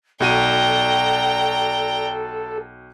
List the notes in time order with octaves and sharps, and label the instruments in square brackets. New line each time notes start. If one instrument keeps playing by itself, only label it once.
[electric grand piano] B1 F#4 D#7 [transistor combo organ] A4 [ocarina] D5 [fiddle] G5 A#5